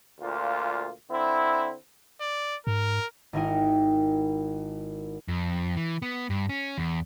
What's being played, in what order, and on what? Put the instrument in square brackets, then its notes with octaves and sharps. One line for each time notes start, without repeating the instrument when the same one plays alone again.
[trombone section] D2 A#2 F4
D3 C4 E4
[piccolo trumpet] D5
[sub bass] G#2 [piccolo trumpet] A#4
[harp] G#1 D#4 E4 A#4 G5 D#7
[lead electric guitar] F2
E3
B3
G2
C#4
E2